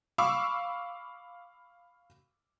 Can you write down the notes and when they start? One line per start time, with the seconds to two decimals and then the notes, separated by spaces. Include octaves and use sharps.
0.18 F5 B5 C#6 D6 E6